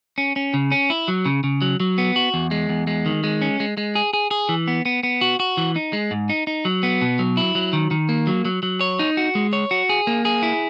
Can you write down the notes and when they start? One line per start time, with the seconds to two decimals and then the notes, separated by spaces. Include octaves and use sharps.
0.18 C#4
0.36 C#4
0.54 C#3
0.72 C#4
0.90 E4
1.08 F#3
1.25 C#3
1.44 C#3
1.62 F#3
1.80 F#3
1.98 B3
2.16 F#4
2.34 E2
2.51 G#3
2.69 E2
2.87 G#3
3.06 D#3
3.24 G#3
3.42 C#4
3.60 G#3
3.78 G#3
3.95 G#4
4.13 G#4
4.31 G#4
4.49 E3
4.68 B3
4.85 B3
5.03 B3
5.21 F#4
5.40 F#4
5.57 E3
5.76 D#4
5.93 G#3
6.11 G#2
6.29 D#4
6.47 D#4
6.65 F#3
6.83 B3
7.02 B2
7.19 F#3
7.37 E4
7.55 F#3
7.73 D#3
7.91 D#3
8.09 A#3
8.27 F#3
8.45 F#3
8.63 F#3
8.81 C#5
8.99 D#4
9.17 F#4
9.35 G#3
9.53 C#5
9.71 F#4
9.89 G#4
10.07 A#3
10.25 G#4
10.43 E4